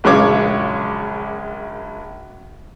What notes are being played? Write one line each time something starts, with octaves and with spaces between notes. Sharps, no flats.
A#1 F#2 C#3 G#3 C#5 D6